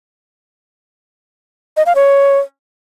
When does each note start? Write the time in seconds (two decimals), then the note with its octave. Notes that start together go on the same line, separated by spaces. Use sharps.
1.77 D#5
1.86 F5
1.95 C#5